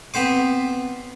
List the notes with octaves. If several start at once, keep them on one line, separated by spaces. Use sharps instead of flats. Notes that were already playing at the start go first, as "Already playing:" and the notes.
B3 C4 C5 D6